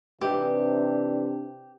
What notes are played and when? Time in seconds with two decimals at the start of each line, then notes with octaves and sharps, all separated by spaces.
0.21 C3 E3 D4 D#4 G4 B4